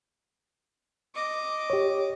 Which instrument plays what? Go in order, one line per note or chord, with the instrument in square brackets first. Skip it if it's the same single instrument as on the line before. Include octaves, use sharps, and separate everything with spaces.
[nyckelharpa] D#5 D6
[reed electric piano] G4 C#5